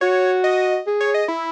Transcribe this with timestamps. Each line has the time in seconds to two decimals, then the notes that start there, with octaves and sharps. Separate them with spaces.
0.01 F#4 C#5
0.44 D#5
0.87 G#4
1.00 C#5
1.14 D#5
1.28 E4